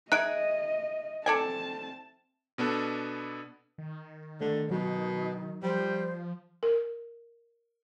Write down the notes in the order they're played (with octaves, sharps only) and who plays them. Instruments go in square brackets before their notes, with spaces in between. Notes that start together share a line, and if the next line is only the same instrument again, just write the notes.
[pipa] D#4 G#4 [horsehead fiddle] D#5 [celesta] E5 [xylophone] F#6 D7
[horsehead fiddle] C4 A5 [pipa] A4 D5 G#5
[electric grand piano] B2 B3 D4 A4
[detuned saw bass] D#3
[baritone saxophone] D3 [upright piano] A3 [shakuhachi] D5
[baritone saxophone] B2 [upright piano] F#3 [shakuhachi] D#4
[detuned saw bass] F3 [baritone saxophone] G3 [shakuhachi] C5
[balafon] A#4